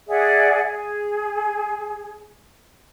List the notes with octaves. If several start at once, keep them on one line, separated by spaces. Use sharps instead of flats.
G#4 D5 E5 F#5
G#4